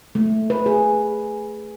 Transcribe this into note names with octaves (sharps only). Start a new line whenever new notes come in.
A3
B4
G#4